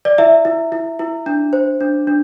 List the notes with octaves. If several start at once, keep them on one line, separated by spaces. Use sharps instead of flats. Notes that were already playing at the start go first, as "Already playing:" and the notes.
D5
E4 E5
E4
E4
E4
D4
C5
D4
D4